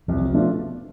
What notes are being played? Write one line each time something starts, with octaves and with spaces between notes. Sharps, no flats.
C2 F3
E3
F3
B2 A3 D4 F4